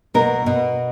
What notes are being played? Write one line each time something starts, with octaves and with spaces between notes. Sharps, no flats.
B2 A#4
B2